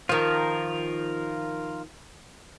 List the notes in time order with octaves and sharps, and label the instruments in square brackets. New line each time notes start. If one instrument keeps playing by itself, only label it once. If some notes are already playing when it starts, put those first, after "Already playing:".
[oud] D#3 F3 [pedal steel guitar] F4 A#4